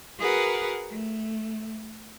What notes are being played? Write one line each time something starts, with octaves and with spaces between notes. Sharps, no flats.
F#4 G#4 A#4 B4 F#5
A3